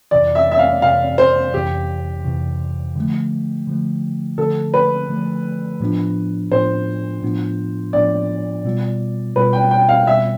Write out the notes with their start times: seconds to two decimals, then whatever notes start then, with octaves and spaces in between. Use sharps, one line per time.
0.11 F2 C3 E3 D5
0.35 E5
0.52 E5
0.59 F5
0.82 F2 C3 E3 F5
1.18 C5
1.54 F2 C3 E3 G4
2.25 F2 C3 E3
2.95 D3 F3 A3
3.67 D3 F3 A3
4.38 D3 F3 A3 A4
4.74 B4
5.09 D3 F3 A3
5.80 A2 F3 B3 D4 F4
6.51 A2 F3 B3 D4 F4 C5
7.22 A2 F3 B3 D4 F4
7.93 A2 F3 B3 D4 F4 D5
8.64 B2 G3 B3 F4
9.36 B2 G3 B3 F4 B4
9.53 G5
9.71 G5
9.89 F5
10.07 B2 G3 B3 F4 E5